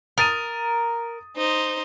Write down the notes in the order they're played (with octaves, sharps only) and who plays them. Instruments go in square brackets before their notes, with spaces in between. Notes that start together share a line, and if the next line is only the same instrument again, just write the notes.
[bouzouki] A#4 [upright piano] D#6 A6 D#7
[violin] D#4 C5